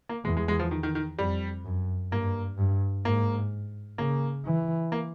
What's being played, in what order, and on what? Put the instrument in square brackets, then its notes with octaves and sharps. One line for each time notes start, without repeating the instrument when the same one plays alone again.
[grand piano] A#3
[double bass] E2 [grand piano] G#3
[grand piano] G#3
G#3
F3
D#3
D#3
D#3
[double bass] F2 [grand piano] G3
[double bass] F#2
[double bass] G2 [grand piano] A#3
[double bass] G2
[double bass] G#2 [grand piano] A#3
[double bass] C#3 [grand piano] A#3
[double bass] E3
[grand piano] A#3